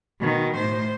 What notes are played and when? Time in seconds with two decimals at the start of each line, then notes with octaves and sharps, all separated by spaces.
0.20 B2 D#3
0.57 A2 C5